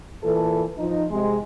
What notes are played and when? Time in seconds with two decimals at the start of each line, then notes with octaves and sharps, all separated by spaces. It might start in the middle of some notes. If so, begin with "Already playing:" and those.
0.23 A#2 E3 A4
0.78 F3 D#4
1.11 C3 G#3